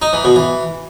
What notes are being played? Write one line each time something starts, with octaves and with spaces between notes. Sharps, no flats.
D#4
E3
B2
E3